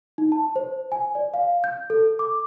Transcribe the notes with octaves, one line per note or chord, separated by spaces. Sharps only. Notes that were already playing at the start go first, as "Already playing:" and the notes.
D#4
A5
C5
G#5
D5
F5
G6
A4
D6